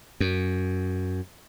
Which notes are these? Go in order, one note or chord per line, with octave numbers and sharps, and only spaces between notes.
F#2